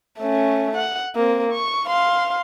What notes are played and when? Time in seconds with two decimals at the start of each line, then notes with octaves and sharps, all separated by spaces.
0.19 A3 C#4
0.77 F#5
1.15 A#3 C4
1.52 C#6
1.87 F5 C6